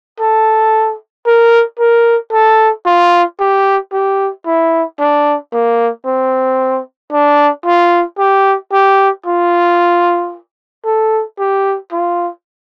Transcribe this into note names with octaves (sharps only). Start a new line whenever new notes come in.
A4
A#4
A#4
A4
F4
G4
G4
E4
D4
A#3
C4
D4
F4
G4
G4
F4
A4
G4
F4